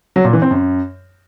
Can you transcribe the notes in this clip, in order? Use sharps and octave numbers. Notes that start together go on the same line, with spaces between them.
F#3
A#2
E3
C4
F#2